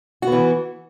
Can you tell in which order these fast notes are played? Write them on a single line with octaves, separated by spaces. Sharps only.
F#4 B3 E3